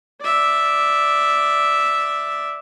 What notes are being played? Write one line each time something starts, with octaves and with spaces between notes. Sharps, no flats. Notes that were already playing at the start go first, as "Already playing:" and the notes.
D5 E5